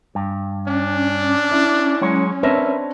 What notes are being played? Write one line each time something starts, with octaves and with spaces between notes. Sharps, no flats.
G2
C#4 D4
E4
F#3 G#3 C#5
C4 D4 A#4 B4 C#5 E5